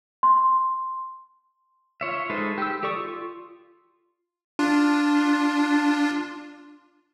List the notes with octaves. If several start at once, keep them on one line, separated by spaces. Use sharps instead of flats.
C6
F4 C#5 E5
G#3 D#4 A4 B4 C5
G4 E6
G4 A4 D5 C#6 D#6
F4
D4 F4